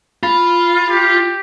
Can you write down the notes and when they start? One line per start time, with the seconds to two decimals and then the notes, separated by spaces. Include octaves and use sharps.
0.23 F4 B5
0.90 G4